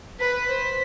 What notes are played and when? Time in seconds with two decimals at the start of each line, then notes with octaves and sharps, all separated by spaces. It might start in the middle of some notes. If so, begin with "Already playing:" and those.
0.20 B4 B6
0.49 C5